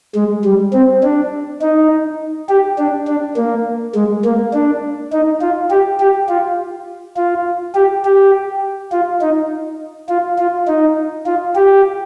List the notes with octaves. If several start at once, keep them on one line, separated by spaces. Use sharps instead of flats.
G#3
G3
C4
D4
D#4
G4
D4
D4
A#3
G#3
A#3
D4
D#4
F4
G4
G4
F4
F4
G4
G4
F4
D#4
F4
F4
D#4
F4
G4